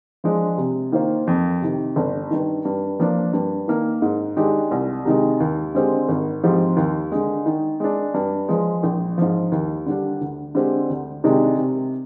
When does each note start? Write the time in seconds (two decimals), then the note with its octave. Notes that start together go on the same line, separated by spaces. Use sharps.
0.24 F3 G#3 D4
0.58 C3
0.92 D#3 A#3 F4 C5
1.27 F2
1.62 C3 D#3
1.96 G1
2.31 G2 D#3
2.65 G2
2.99 F3 A#3 D4
3.33 G2
3.68 D#3 A#3
4.02 G#2
4.37 D#3 G#3 D4 G4
4.71 C2
5.05 C3 D#3 G#3
5.40 D#2
5.75 D3 G#3 C4 G4
6.08 G#1
6.43 G#2 F3 C4 G4
6.77 D#2
7.12 D3 G#3
7.46 D#3
7.80 G#3 D4
8.14 G2
8.49 F3 G#3
8.83 A#1
9.18 G#2 F3
9.52 D#2
9.86 D3 G3 D4
10.21 D2
10.55 D3 G#3 C4 G4
10.90 D2
11.24 C3 D#3 G#3 D4
11.58 C3